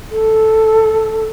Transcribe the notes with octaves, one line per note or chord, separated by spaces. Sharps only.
A4